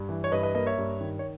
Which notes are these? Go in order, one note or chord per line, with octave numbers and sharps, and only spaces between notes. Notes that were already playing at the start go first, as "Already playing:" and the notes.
Already playing: G2
E3
C#5
G2 B4 D#5
B4 D#5
A#3 B4 D#5
C#5 E5
G2
D#3
C#5